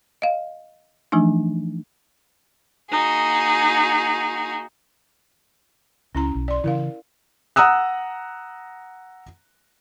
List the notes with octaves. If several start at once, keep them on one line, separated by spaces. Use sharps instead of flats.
D#5 F5
E3 F3 A3 D4 D#4
A#3 D#4 F#4 G#4
C#2 C#4 E4 A#5
B1
D5 C6
C#3 E3 E4 A#4 F5
F#5 A#5 D#6 E6 F#6